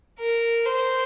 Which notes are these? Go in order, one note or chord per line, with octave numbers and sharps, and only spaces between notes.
A#4
C5